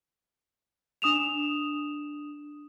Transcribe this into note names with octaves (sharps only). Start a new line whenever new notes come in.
D4 D#6 E7 F7